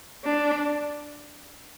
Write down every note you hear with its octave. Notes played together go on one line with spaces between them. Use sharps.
D4